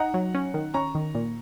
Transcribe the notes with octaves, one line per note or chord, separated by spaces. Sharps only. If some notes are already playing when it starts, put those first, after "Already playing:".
Already playing: D#4 F#5 A#5
F#3
C#4
D#3
C#4 A#5 C#6
D#3
A#2